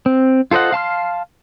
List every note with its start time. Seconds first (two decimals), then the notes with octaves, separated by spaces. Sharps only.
0.06 C4
0.51 F4 A4 C5 D#5 F#5
0.72 F5 A5 C6 F6